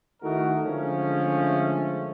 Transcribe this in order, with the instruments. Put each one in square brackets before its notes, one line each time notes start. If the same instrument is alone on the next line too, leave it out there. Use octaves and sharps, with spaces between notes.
[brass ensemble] D#3 A3 D#4 E4 F#4 A#4
D3 F3 G#3 A3 C#4